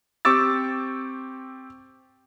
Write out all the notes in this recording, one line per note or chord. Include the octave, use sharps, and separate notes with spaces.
C4 G4 C#6 D6 E6 A6